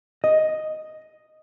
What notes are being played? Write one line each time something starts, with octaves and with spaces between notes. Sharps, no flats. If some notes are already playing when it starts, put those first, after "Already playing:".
D#5